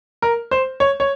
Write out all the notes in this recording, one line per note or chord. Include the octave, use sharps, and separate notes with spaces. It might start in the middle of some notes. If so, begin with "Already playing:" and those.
A#4
C5
C#5
C#5